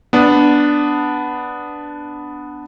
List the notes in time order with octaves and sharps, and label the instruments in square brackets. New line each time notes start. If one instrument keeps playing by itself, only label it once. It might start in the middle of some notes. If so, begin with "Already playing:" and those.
[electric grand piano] B3 D4